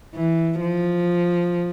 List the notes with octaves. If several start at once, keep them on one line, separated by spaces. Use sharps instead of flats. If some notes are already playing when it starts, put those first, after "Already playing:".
E3
F3